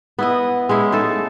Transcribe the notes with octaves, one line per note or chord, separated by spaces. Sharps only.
B3 E4 D#5
G#3 C#4 E4 F5
A3 D#4 A4